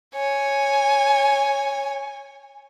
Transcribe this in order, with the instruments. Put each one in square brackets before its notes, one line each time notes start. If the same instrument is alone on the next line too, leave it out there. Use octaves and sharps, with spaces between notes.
[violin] C#5 [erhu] G#5